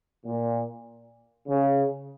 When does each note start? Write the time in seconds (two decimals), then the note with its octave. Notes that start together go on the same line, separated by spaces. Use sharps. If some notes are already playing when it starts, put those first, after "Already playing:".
0.26 A#2
1.49 C#3